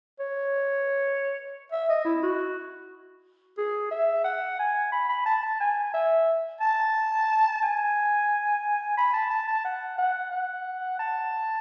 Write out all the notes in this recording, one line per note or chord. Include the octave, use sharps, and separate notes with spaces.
C#5
E5
D#5
E4
F#4
G#4
E5
F#5
G#5
B5
B5
A5
A5
G#5
E5
A5
G#5
B5
A5
A5
A5
F#5
F#5
F#5
A5